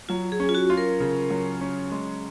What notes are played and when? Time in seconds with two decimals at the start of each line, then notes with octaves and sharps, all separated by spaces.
0.09 F#3 F4
0.32 G#4
0.40 C#4
0.49 F4
0.55 F#4
0.70 F4
0.77 A#4
1.00 C#3
1.30 F#3
1.61 C#4
1.92 G#3